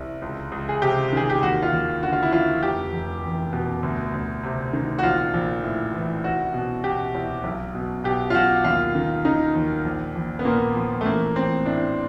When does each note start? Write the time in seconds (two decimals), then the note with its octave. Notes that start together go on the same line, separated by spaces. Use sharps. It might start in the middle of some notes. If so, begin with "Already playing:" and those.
Already playing: C2
0.22 C#2
0.52 C#2
0.69 G#4
0.82 C3 G4
1.13 D#3 G#4
1.30 G4
1.42 D#2 F#4
1.62 F4
1.72 D#2
2.03 D3 F#4
2.13 F4
2.23 E4
2.32 F3 F4
2.63 F1 G4
2.93 F1
3.23 E2
3.53 B2
3.83 D2
4.14 D2
4.43 C3
4.73 D#3
4.98 F#4
5.03 A#1 F4
5.34 A#1
5.64 A2
5.94 E3
6.24 C2 F#4
6.54 B2
6.84 B2 G4
7.15 C2
7.44 B1
7.75 B2
8.04 B2 G4
8.30 F4
8.34 B1 F#4
8.64 D#2 F4
8.95 D#3
9.25 D#3 D#4
9.55 D#2
9.85 A#1
10.15 A#1
10.39 B3
10.45 A#2 A#3
10.76 F3
11.01 A3
11.06 A1 A#3
11.35 A1 C4
11.65 A2 D4